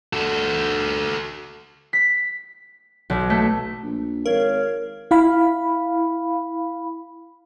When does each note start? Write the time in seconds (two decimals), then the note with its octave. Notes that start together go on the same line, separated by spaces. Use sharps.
0.13 F#4 A4
1.93 B6
3.10 B1
3.30 A3
3.83 A#1
4.26 G#1 A#4 C#5 F5
5.11 E4 F5 B5